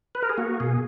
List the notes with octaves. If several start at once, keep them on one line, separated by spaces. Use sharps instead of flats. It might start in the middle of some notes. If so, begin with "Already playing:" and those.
B4
A#4
G#4
A#3 F#4
B2 G#4